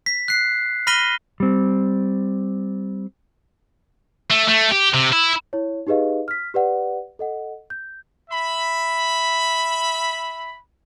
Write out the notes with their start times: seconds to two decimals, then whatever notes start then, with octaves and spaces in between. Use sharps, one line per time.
0.06 B6
0.28 F#6 C7
0.87 B5 F6 A#6 B6 D#7 G7
1.40 G3 C4
4.30 A3
4.48 A3
4.71 G4
4.94 C3
5.13 E4
5.53 E4 C#5
5.87 D#4 G4 G#4 B4 D#5 F5
6.28 F6 B6
6.54 G4 B4 D5 F#5
7.19 A4 D#5 F#5
7.70 G6
8.30 E5 B5